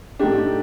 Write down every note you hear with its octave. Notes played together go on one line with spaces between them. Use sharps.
A2 A3 D4 D#4 G4